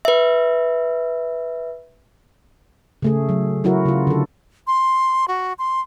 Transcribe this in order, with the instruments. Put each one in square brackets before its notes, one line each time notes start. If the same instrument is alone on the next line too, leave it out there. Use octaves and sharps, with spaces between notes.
[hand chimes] B4 E5
[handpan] C#3 A3 G#4
F#3
F#3 E4 F#4 A#4
C#3 F4
D3 A4
[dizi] C6
F#4
C6